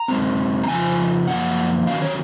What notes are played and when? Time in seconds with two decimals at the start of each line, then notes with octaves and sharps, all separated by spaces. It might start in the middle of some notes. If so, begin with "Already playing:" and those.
Already playing: A#5
0.08 F#2 C#3 G#3 C4
0.63 A#5
0.68 F2 C#3 F3 G#5
1.27 F#2 F3 A#3 F#5
1.87 D#3 F#3 C#4 F5
2.02 C#5